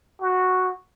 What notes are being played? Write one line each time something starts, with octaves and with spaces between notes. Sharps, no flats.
F#4